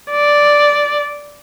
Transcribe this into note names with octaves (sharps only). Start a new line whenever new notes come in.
D5